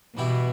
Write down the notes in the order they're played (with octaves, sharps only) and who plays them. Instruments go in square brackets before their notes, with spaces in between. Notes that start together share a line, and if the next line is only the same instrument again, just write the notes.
[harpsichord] G2 E3 B3 E4 G4 [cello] B2